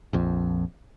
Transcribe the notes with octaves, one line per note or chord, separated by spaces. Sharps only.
A#1 F2